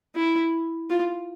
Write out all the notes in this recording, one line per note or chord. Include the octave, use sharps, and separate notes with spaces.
E4
F4